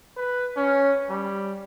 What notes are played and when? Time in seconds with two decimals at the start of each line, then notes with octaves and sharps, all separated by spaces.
0.17 B4
0.57 C#4
1.09 G3